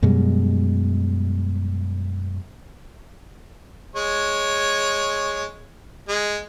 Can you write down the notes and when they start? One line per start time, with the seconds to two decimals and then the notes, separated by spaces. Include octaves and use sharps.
0.03 F#2 B2 G3 G#3
3.95 G#3 C#5
6.08 G#3